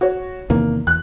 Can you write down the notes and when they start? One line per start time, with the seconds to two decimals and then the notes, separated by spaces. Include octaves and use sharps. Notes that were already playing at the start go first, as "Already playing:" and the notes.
0.01 F#4 C#5
0.50 E2 C3 D#3 A#3
0.87 E2 F#6